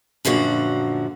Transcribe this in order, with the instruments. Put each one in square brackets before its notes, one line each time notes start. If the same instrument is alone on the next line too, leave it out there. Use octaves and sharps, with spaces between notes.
[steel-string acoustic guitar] F#2 A#2 D3 F3 F#4